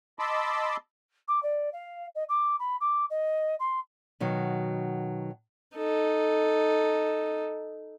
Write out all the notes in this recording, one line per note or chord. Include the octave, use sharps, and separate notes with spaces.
D#5 A5 B5 C6 D6 E6
D6
D5
F5
D#5
D6
B5
D6
D#5
C6
B2 D#3 F#3
D#4 A4